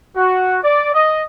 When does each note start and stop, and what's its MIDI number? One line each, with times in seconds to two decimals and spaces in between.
0.16 0.58 66
0.63 0.92 74
0.93 1.23 75